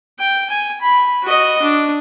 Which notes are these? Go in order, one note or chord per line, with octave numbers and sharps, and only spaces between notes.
G5
G#5
B5
F#4 D#5
D4